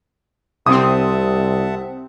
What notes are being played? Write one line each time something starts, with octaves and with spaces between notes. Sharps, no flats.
C2 C3 C4 E5 F#5 A5 D#6